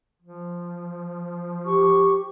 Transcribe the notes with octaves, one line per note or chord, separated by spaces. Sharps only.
F3
G4 C#6